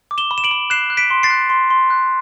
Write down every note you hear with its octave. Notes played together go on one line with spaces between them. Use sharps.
D6
E7 G7
B5
E7
D7 F#7
B5
F#6 C7 E7
F#6
B6 D7
C6
A6 C7
F#6
C6
C6
F#6